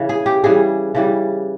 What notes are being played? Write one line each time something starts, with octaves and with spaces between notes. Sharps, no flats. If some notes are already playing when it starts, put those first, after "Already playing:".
Already playing: C#3 E3
G#4
G4
C#3 E3 G3 G#4
C#3 E3 G3